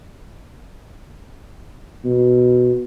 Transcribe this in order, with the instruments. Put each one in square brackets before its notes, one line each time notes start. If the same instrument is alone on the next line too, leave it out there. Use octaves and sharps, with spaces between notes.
[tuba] B2